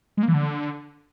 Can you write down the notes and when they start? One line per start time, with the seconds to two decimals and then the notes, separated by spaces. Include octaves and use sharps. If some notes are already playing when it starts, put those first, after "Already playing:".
0.17 G#3
0.23 A#3
0.28 E3
0.34 D3